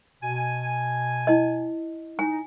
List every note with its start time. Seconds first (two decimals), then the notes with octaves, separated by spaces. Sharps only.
0.23 B2 G#5
1.27 E4 D#5
2.19 D#4 G#5